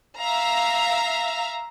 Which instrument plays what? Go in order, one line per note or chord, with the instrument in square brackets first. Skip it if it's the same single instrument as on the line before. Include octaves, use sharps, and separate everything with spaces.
[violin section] E5 F5 A#5